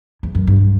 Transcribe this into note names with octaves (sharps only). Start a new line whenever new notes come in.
E2
F#2
G2